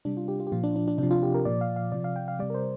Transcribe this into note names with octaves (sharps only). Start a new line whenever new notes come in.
C3 G3 D4
F4
G4
F4
G4
A#2 F3 F4
D4
D4
D4
C3 F3 D4
F4
G4
A#4
A#2 F3 D5
F5
F5
C3 F3 D5
F5
G5
F5
C3 G3 D5
A#4
C5